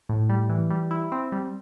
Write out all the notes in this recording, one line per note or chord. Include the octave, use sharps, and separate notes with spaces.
A2
G3
E3
G3
E4
C4
G3